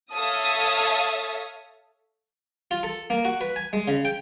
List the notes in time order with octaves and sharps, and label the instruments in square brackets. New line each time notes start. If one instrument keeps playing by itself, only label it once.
[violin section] A4 C#5 E5 F5 A5 D#6
[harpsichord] F4
A4
A#3
F#4
B4
G#5
G#3
C#3
G5